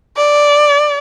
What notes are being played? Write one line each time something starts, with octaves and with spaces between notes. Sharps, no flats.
D5